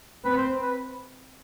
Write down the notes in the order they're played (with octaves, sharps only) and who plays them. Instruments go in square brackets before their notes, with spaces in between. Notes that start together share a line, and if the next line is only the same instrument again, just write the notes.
[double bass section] C4 [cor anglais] B4
[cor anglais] C5
B4